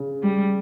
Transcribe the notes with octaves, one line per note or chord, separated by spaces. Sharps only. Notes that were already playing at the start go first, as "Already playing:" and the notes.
Already playing: C#3
G3